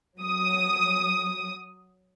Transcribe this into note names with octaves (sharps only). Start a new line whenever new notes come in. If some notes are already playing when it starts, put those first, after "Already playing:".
F#3 D#6